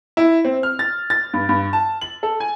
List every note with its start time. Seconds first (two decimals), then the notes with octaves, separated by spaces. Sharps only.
0.17 E4
0.45 C4
0.63 F6
0.79 A6
1.10 A6
1.34 G2
1.49 G2
1.73 A5
2.01 F#7
2.23 A4
2.40 G#5